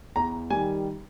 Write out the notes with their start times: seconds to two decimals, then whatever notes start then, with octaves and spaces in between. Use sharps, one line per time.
0.16 E2 A#5
0.50 D#3 G3 G#5